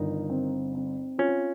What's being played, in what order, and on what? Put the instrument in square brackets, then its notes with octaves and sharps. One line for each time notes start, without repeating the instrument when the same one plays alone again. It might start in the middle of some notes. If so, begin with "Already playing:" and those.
Already playing: [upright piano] G1 D#3 [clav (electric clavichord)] D#4
[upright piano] C4
C4
[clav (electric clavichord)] C#4 [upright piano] F4